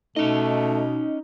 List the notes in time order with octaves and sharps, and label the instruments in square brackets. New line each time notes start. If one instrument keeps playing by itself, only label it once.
[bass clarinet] B2 [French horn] A3 [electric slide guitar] C#4 D#5 [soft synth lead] D#4